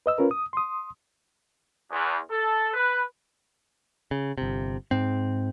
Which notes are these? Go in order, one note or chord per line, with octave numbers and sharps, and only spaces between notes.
B4 D#5 E6
C#4 F4 A#4 B4
D#6
C6 D#6
E2
A4
B4
C#3
G1 C3
G#2 C4